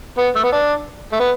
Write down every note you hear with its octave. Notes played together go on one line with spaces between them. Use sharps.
B3
A3
B3
D4
A3
B3